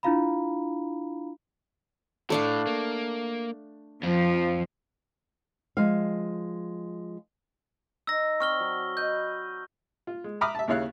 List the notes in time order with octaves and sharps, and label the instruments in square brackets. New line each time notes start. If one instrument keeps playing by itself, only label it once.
[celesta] D4 E4 F4 F5 A#5 B5
[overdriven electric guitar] A2 [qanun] A3 D4 F5
[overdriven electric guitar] A#3
[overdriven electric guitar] F2 [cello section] F3
[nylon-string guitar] F3 G#3 F5
[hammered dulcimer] D#4 [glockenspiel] E6 A#6
[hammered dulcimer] C4 D5 [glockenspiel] C#6 F6 G7
[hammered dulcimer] F#3
[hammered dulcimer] D#5 B5 [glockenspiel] G6
[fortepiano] F4
G#3
E5 A#5 B5 D6 D#6 F6
E5 A5
D#2 C#3 E4 C#5 F5 F#6